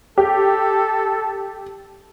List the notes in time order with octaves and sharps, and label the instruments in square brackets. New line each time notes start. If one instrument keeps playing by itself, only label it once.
[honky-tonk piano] G4 [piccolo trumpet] A4